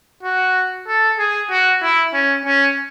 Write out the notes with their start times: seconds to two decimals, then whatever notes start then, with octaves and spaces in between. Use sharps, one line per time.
0.23 F#4
0.88 A4
1.19 G#4
1.51 F#4
1.82 E4
2.14 C#4
2.45 C#4